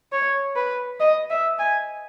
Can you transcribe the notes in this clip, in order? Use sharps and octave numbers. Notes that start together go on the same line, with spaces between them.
C#5
B4
D#5
E5
G#5